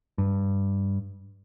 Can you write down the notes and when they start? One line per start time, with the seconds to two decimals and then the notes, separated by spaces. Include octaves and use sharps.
0.18 G2